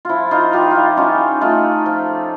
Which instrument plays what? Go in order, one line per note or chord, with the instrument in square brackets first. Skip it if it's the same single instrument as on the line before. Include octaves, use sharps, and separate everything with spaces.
[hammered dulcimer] F3 E4 F4
D#4 F4
F3 F4 G4
E4 F4
C#4 D#4 F4
A3 D#4 F4
F3